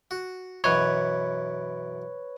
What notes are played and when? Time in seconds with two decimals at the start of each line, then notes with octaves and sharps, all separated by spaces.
0.11 F#4
0.64 F#2 B2 E3 B4 C#5